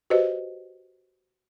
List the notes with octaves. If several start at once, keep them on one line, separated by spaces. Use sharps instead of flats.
F#4 G4 B4 C5 D#5